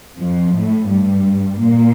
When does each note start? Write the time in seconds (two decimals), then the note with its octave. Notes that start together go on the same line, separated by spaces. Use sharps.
0.18 F2 F3
0.54 A2 A3
0.89 G2 G3
1.60 A#2 A#3